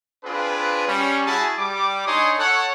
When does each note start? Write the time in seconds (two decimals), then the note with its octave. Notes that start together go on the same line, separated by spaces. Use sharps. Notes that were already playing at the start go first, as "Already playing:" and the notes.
0.24 C4 D4 F4 G#4 B4
0.86 G3 C#4
1.26 E4 F#4 G#4 G#5 A5 B5
1.58 G3 D6
2.06 D4 D#4 C#5 G#5 C6 D#6
2.39 A4 C#5 F#5